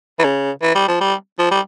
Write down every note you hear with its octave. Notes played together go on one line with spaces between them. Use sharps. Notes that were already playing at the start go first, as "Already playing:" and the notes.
E3
C#3
E3
G3
F3
G3
F3
G3